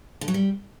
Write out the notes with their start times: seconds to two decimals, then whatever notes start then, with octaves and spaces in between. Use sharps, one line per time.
0.21 D3
0.28 F#3
0.34 G3